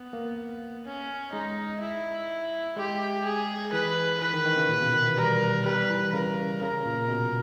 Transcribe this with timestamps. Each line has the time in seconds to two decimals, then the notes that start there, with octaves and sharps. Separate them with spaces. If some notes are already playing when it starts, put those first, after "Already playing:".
Already playing: B3
0.13 A#3
0.85 C#4
1.33 G#3 D#4
1.80 E4
2.77 G#3 G4
3.25 G#4
3.73 E3 B4
4.21 E3 B4
4.33 D#3
4.45 D#3
4.57 C#3
4.69 A#2
4.81 B2
4.94 D#3
5.05 E3
5.18 G3 A#4
5.65 G3 B4
5.90 E3
6.13 C#3 A#4
6.61 C#3 A#4
6.85 A#2
7.09 B2